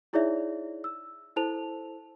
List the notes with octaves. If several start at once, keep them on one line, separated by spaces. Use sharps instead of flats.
D#4 E4 G#4 C#5 D5 E5
E6
E4 A4 C5 A5 F7